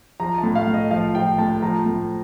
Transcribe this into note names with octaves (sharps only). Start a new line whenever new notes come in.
F3 A#5
A5
A2
F5
A2
D#5
F3 F5
F3 G5
A2 A5
F3 A#5
A2